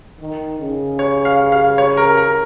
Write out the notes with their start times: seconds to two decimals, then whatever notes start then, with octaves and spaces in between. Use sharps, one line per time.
0.20 D#3
0.60 C#3
0.99 C#5
1.25 F5
1.52 F5
1.78 C#5
1.97 A#4
2.17 A#4